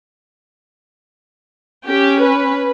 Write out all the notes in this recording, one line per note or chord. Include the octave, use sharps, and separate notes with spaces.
C#4 G4
B4